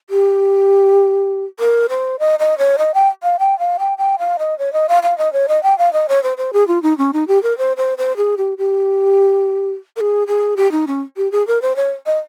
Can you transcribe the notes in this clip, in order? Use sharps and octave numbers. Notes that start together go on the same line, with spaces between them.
G4
A#4
C5
D#5
D#5
C#5
D#5
G5
F5
G5
F5
G5
G5
F5
D#5
C#5
D#5
F5
F5
D#5
C#5
D#5
G5
F5
D#5
C#5
C5
C5
G#4
F4
D#4
C#4
D#4
G4
A#4
C5
C5
C5
G#4
G4
G4
A#4
G#4
G#4
G4
D#4
C#4
G4
G#4
A#4
C5
C#5
D#5